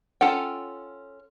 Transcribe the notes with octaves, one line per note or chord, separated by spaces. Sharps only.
C#4 F4 A4 F#5 G5